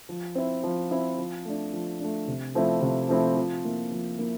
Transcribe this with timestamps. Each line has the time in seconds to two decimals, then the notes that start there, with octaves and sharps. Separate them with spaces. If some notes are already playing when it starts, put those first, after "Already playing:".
0.09 F3
0.35 C4 E4
0.63 F3
0.91 C4 E4
1.18 F3
1.45 A3 D4
1.73 F3
2.00 A3 D4
2.28 C3
2.55 F3 A3 C4 E4
2.82 C3
3.09 F3 A3 C4 E4
3.36 F3
3.65 A#3 E4
3.92 F3
4.18 A#3 E4